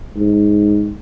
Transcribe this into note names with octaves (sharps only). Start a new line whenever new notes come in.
G#2